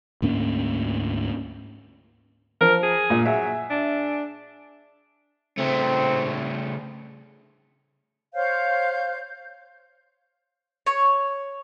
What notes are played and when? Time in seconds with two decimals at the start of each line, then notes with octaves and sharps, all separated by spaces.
0.22 D2 G#2 A#3 C#4
2.61 F3 A#4
2.82 G#4
3.10 A#2 F4
3.25 F#3 G#4 E5
3.70 D4
5.58 C#3 A3 C4
8.34 C5 C#5 F5 G6
10.86 C#5